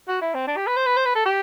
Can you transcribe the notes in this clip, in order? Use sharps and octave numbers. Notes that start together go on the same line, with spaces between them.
F#4
E4
C4
D4
G4
B4
C5
B4
C5
B4
A4
G4